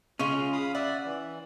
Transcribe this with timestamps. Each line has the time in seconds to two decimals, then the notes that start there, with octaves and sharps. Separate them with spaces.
0.19 C#3 G#3 C#4 F4
0.53 F5 B5 D#6
0.75 D5 E5 F#5
1.06 E3